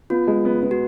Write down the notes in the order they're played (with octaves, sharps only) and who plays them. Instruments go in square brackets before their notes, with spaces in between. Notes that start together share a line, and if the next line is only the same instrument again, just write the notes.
[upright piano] B3 [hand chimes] F4
[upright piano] G#3
B3
B3
[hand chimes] F#4